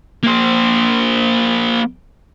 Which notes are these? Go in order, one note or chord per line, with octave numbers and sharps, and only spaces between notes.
A#3 C5